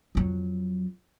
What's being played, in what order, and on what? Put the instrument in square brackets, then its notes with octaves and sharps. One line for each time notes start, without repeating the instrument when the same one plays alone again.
[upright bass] F2 F#3